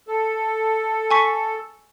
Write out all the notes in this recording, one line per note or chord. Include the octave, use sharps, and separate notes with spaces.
A4
G#5 C#6 B6